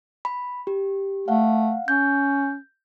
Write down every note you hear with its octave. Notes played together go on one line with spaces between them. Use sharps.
B5
G4
A3 F5 F#5
C#4 G6